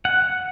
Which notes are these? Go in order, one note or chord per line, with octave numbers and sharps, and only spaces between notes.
F#5